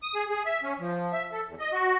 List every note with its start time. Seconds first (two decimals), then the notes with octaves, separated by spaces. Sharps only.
0.03 D#6
0.15 G#4
0.30 G#4
0.46 E5
0.63 C#4
0.79 F3
1.13 E5
1.32 A4
1.47 E2
1.59 D#5
1.73 F#4